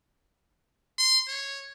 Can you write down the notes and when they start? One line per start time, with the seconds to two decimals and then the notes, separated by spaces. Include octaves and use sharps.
0.98 C6
1.28 C#5